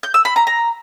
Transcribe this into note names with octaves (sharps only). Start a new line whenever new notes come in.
G6
E6
B5
A#5
A#5